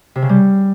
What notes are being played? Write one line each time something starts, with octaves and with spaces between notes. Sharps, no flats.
C3
C#3
G3